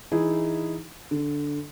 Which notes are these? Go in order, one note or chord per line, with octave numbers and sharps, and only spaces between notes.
E3 D#4 E4 G#4
D3